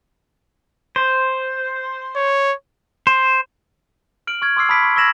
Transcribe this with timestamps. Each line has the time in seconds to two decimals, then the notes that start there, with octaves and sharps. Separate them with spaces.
0.96 C5
2.16 C#5
3.07 C5
4.27 F6 D7 F#7
4.42 C#6 F6 G#6
4.57 C6 D6 E6 F6 C7
4.69 A5 B5 D#6 F6 B6 D7
4.83 C#6
4.96 C#6 E6 G#6 A#6 E7 F#7